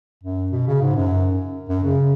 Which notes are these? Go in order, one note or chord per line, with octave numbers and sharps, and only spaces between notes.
F#2
B2
C#3
G#2
F#2
F#2
C#3